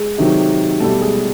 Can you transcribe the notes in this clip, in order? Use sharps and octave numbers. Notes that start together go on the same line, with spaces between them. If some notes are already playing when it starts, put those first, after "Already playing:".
Already playing: G#3 G#4
C3 D#3 F#3
B2 G3 A3 A4
G#3 G#4